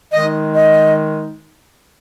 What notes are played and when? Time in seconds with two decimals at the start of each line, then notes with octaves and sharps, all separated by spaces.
0.13 D#3 G#3 D#4 D#5
0.57 D#5